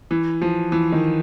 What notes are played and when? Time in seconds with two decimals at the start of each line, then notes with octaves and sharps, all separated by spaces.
0.11 E3
0.42 F3
0.72 E3
0.92 D#3